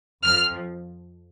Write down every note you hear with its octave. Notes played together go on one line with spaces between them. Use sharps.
F2 F3 F6